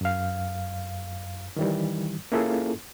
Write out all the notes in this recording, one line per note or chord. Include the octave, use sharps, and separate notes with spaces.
F#2 F5
D#3 E3 G3
A#3 C#4 E4 F4 G#4 A4